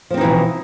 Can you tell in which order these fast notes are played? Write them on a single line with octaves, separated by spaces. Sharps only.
F3 C4 D#4 E3 B2